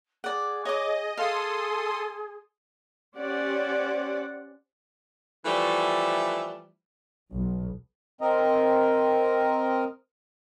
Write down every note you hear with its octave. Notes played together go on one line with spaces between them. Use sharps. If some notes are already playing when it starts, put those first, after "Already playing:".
G#4 D5 F#5
C#5 D#5 D6
G#4 A4 F5 C6 D#6
C#4 G4 C5 D5 F#5
E3 F3 G3 A3
B1
C4 A#4 D#5